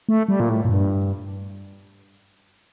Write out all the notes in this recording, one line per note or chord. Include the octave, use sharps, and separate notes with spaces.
A3
G3
A#2
A2
A2
G2